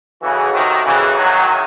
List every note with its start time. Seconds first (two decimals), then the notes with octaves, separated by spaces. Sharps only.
0.22 C#3 E3 F#4 A4 D#5 F#5
0.53 C3 D#3
0.85 C#3 E3
1.17 D#3 F#3
1.48 D#4 G#4 C#5 E5 G#5